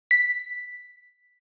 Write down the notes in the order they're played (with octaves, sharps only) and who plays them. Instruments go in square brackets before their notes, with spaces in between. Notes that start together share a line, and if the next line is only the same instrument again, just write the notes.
[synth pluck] B6